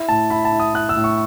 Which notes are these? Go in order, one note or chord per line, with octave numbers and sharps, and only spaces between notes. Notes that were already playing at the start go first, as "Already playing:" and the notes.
Already playing: E4
A2 A5
E4 B5
A5
E4
D#6
E4 F#6
E6
A2
C#6